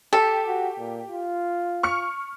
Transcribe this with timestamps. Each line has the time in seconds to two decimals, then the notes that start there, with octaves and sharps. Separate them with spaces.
0.13 G4 A4
0.47 F#4
0.78 A#2
1.08 F4
1.83 C#6 F6 C#7